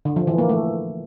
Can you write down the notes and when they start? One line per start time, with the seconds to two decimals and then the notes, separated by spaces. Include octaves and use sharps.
0.05 D3
0.16 F3
0.27 E3
0.38 A#3
0.49 A3